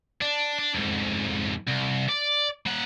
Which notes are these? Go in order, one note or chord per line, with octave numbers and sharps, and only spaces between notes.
D4
D4
F2 G#2
C2
D5
A#3 F#5